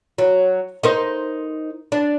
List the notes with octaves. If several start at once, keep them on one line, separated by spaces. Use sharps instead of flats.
F#3
D#4 A#4 C5
D4